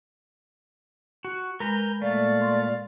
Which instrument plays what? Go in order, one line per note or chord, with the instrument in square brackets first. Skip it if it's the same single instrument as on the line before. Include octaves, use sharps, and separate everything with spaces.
[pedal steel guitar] F#4
[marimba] G#3 [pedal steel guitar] A#4 B4 A#5 [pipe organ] G6
[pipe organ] A#2 F5 [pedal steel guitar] A3 [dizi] D5
[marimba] C6